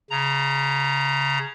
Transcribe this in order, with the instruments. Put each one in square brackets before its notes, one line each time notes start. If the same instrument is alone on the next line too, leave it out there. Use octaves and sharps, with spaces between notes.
[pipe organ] C#3 A#5